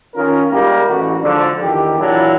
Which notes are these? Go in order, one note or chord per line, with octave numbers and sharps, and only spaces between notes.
D#3 C#4 F4 A#4
G3 G#3 A#3 E4 G4
A1 F#4
G#2 D3 F3 D4
E2 D#3 G4
A#2 E3 F#3 D4 E4 F4